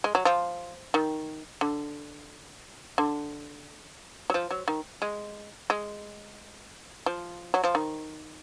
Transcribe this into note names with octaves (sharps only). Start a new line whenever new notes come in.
G#3
F#3
F3
D#3
D3
D3
F#3
F3
F#3
D#3
G#3
G#3
F3
F#3
F3
D#3